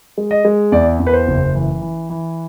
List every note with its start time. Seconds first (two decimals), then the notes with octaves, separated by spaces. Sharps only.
0.18 G#3
0.31 D#5
0.45 G#3
0.72 E2 D5
1.00 E2
1.06 B4
1.13 C5
1.28 F#1
1.55 E3
1.82 E3
2.10 E3